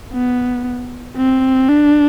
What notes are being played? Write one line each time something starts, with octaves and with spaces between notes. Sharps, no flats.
B3
C4
D4